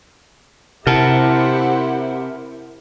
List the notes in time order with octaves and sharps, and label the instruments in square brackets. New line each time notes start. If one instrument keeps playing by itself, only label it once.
[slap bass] C3 [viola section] E4 G4 C5 [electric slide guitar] A#4 A5 [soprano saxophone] F#5